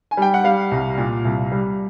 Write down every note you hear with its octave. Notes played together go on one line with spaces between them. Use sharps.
G#5
G3 G5
F#5
G3 F5
C2
A#2
C2
G3